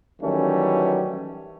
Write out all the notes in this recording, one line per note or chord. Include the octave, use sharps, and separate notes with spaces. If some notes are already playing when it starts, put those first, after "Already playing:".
D#3 E3 F#3 G3 A3 C#4